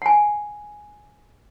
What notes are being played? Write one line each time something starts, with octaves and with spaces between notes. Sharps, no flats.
F#5 G#5